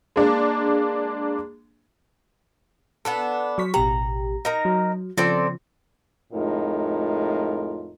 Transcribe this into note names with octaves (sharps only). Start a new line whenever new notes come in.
G#3 A#3 D4
B3 D4 A4
F#3 C#6 B6
A1 B2 G4 A#5
D#4 A#4 A#5
F#3
C#3 F3 C4 A4 D5
F2 A2 G#3 D#4 F4 A#4